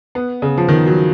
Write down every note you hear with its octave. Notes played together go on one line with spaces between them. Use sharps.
B3
C#3
F3
D#3
F#3